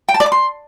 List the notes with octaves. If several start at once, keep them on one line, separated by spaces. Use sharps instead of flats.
G5
A5
D5
D6
C6